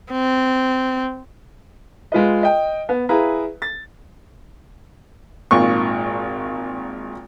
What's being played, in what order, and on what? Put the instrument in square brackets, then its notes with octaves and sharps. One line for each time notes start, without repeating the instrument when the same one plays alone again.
[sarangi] C4
[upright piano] G#3 F4 B4 D#5
D#5 G5
B3
E4 G#4 B4 F5 A#5
A6
[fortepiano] G#1 A#2 F4 C#6